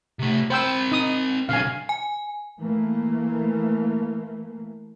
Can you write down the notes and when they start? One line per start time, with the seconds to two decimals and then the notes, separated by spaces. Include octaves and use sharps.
0.19 C3 A3
0.50 C4 C5 G5 B5 E6
0.92 D#4 D#6
1.49 B1 D3 F5 G#5
1.89 G#5
2.60 E3 A3 A#3